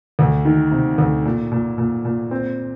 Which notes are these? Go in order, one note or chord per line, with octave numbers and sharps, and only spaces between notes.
D2
D#3
C3
D2
A#2
A#2
A#2
A#2
C4